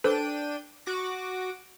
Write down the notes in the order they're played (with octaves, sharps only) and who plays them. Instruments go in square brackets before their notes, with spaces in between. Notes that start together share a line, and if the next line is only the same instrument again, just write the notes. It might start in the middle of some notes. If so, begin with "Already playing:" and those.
[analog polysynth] D4 G5 D#7 [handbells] A4 B4 C5
[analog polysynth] F#4 D6 A#6